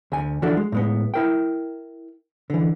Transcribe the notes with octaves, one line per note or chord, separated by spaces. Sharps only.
D2 G#5
D3 E3 F3 D4 F#4 A4
G#3
A2 G#3 B3
E4 A#4 G5
D3 E3